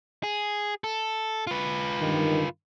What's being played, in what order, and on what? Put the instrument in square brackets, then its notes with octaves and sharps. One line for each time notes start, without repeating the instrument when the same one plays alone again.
[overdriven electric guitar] G#4
A4
F4 B4
[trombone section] G2 D#3